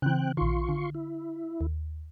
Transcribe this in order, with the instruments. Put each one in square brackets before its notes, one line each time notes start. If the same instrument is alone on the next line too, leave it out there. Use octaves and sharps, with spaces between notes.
[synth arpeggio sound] C#3 E3 [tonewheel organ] C4 G5 F#6
[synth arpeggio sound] A#1 D#3 [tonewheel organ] F4 C6 C#6
[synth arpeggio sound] D3
[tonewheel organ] E4
[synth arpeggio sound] D#2